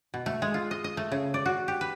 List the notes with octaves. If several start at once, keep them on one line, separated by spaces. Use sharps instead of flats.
B2
A3
G#3
F4
D#5
D#5
A3
C#3
D5
F#4
G4
B4